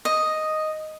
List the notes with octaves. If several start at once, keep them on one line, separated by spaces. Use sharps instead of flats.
D#5